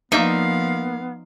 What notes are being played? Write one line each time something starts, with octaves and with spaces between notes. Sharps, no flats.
F3 A#3 B3 D#4 D5 E5 F5